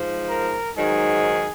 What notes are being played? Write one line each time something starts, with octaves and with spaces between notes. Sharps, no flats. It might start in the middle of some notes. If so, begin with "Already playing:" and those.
Already playing: G#2 F3
A#4
G#2 D#3 F#3 G#4